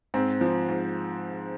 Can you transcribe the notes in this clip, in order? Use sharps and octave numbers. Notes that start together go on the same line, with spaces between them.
G#2 C4
F3
G#2